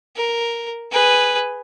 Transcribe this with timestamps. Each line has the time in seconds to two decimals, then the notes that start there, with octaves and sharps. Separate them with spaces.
0.16 A#4
0.92 G#4 B4